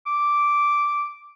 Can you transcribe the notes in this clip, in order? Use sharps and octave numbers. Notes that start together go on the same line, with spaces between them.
D6